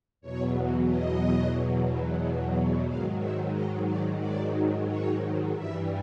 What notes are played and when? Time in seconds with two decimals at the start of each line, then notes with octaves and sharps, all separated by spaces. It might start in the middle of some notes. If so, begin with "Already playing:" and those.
0.21 E2 B2 F#3 C#5
0.87 D#5
2.86 G#2 D#3 F#3 F5
3.19 E5
3.53 D#5
3.86 D5
4.19 D5
4.86 C#5
5.52 G2 E3 G3 E5